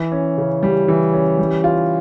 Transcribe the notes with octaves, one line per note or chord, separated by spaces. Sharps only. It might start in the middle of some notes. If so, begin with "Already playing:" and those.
Already playing: E3
C#4
C#3
G3
E3
C#4
G3
F4